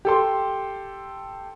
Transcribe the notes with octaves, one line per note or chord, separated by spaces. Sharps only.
G4 A4 C6